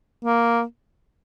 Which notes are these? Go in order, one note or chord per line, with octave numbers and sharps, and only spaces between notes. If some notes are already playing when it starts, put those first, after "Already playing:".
A#3